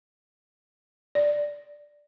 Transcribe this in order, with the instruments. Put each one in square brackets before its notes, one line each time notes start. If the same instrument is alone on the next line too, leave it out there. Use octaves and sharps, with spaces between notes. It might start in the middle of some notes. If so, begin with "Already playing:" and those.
[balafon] D5